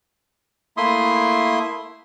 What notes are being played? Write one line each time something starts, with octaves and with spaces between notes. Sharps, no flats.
A3 A#3 E4 E5 C6 D#6